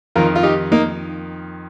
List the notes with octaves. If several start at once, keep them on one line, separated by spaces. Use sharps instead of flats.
F2 D#3 F4 A#4
F4
D#4 G4
A#3 D#4